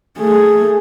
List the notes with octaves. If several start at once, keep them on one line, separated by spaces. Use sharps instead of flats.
A3 G#4